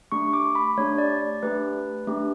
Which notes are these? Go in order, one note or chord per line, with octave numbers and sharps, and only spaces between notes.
A3 D4 G4 C#6
D6
B5
A3 D4 G4 C#5
D5
D5
A3 D4 G4 B4
A3 D4 G4